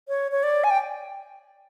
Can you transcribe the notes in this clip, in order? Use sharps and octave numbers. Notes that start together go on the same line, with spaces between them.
C#5
C#5
D5
G#5
G5